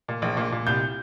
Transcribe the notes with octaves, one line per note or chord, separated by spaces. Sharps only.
A#2
A#1
A#2
A#2
C2 G6